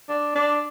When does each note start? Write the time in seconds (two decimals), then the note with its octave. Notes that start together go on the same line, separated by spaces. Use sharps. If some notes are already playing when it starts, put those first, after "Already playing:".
0.09 D4
0.36 D4